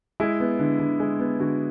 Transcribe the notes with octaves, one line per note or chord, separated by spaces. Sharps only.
G#3 E4
B3
D3
D3
G#3
B3
D3 F#4